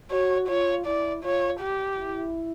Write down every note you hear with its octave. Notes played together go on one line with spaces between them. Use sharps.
F#4 C#5
F4 C#5
E4 D5
F4 C#5
G4
E4